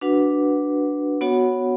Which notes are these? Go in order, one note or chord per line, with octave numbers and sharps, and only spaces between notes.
D4 F#4 B4 F#5
B3 F#4 C#5 F#5